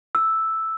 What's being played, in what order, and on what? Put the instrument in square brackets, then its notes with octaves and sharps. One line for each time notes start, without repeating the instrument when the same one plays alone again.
[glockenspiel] E6